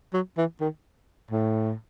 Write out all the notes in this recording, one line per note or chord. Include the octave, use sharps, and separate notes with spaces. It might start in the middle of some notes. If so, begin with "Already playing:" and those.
F#3
E3
D#3
A2